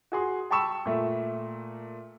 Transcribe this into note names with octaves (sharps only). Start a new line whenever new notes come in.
F#4 G#4 C6
G5 A5 B5 C#6 E6 E7
A#2 A3